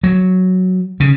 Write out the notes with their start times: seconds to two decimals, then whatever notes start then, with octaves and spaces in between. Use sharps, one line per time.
0.04 F#3
1.00 C#3